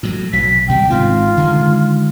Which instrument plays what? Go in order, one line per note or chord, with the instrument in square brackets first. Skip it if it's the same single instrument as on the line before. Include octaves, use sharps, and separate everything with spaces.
[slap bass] A2 F#3
[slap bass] B1 F#3 [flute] B6
[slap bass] D2 C3 G3 [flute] G5
[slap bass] G#1 G#2 C4 [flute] F4
[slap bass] D3 D#3 G#3